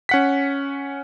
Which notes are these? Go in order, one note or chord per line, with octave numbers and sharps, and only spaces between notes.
C#4 F#5 B6